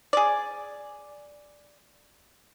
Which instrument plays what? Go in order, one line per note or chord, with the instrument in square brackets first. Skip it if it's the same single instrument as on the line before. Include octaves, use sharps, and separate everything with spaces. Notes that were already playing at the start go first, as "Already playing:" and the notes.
[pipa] G#4 D5